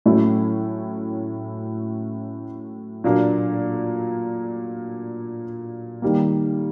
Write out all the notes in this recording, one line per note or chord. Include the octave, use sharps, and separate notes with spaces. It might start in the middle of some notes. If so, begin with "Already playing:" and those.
A2 F#3 A3 C#4 E4
A#2 F#3 A#3 D4
D#3 G3 A#3